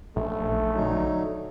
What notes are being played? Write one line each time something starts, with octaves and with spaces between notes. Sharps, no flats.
A#1 A3
D3 F#3 D#4